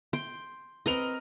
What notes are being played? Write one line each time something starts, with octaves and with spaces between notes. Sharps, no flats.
G5 C6
C4 A#4 B4 D#5 F7